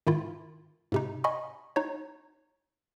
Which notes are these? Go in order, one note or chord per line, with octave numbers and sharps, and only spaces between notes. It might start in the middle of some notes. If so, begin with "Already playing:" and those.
G#2 D#3 E4 F4
G#2 C3 D#4
D#5 G#5 B5 C#6
D#4 C#5